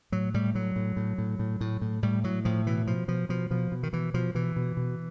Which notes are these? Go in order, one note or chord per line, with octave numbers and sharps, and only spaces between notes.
A2 F#3
A2 G3
A2 F#3
A2
A2
A2
A2
A2
A2
A2 G3
A2 F#3
A2 F3
B2 E3
B2 F3
B2 F3
B2 F3
B2 F3
B2
D#3
B2 E3
B2 F3
B2 E3
B2
B2